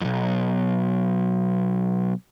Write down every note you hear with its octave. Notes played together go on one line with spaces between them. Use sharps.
B1 F2